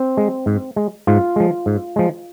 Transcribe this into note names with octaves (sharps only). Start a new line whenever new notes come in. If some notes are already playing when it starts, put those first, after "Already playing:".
Already playing: C4
G#3
G#2
G#3
G#2 F4
F3 G#3
G#2
F3 G#3